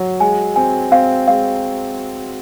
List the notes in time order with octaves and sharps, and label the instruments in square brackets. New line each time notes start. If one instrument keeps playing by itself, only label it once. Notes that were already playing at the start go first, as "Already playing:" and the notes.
Already playing: [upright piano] F#3
[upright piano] G#3 [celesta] G#5
[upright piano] C4 [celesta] G#5
[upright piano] C4 [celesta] F5
[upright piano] G#3 [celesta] F5